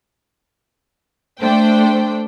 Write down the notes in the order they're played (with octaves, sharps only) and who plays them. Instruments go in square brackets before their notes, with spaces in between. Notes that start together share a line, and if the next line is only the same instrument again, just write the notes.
[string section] A3 D4 C5 G5